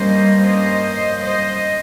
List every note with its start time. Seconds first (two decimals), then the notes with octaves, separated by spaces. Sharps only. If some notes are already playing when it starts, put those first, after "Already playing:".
Already playing: G2 G3 A#3 C#4 C5 D#5
0.44 C5 D#5
1.24 C5 D#5